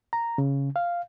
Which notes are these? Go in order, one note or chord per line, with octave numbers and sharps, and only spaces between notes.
A#5
C#3
F5